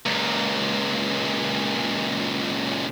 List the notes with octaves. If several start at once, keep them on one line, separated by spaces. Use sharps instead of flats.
C#2 A#2